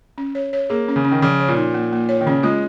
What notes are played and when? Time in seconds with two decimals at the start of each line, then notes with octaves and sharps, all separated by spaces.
0.18 C#4
0.35 C#5
0.53 C#5
0.70 A#3 G#4
0.88 C#4
0.96 C#3
1.05 C#4
1.12 D#3
1.22 C#3 F3
1.40 C#5
1.48 A#2
1.57 D#4
1.74 A#3
1.92 A#3
2.09 C#5
2.21 D#3
2.26 C#3 C#4
2.43 G#3 F4